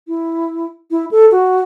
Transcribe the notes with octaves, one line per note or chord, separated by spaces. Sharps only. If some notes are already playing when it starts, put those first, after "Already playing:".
E4
E4
A4
F#4